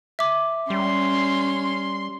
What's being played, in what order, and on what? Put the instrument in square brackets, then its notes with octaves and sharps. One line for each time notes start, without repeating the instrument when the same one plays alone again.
[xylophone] E5 D6
[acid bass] G3 [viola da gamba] C#4 [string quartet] C6